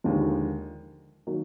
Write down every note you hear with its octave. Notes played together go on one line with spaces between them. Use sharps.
D#2 D3 F3 G#3
D#3 F#3 A#3